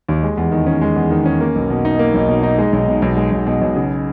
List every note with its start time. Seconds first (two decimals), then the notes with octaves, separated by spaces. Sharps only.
0.09 D#2
0.23 G#3
0.37 E2
0.52 D#3
0.66 C#4
0.81 G#3
0.96 E2
1.10 D#3
1.25 C#4
1.41 A#3
1.55 B1
1.70 B2
1.85 D#4
1.99 A#3
2.14 B1
2.29 B2
2.43 D#4
2.58 G#3
2.73 B1
2.88 B2
3.02 B1
3.17 G#3
3.32 B1
3.47 B2
3.61 B1
3.76 C#3